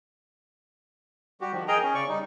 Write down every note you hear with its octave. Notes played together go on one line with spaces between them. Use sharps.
G3 F#4 G4
D#3 F3
G#4 A#4 D#5 G5 A#5
C#4
C#3 D5 C#6
G3 D#4